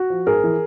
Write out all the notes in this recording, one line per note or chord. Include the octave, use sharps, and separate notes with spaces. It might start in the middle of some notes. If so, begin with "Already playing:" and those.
Already playing: F#4
F3
G#2 G#4 A#4
E3